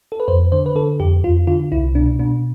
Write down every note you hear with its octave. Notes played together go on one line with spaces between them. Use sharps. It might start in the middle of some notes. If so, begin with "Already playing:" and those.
A4
B4
F2 C5
D3 C5
B4
D3 A4
F2 G4
F2 F4
D3 F4
C2 E4
B2 D4
B2 D4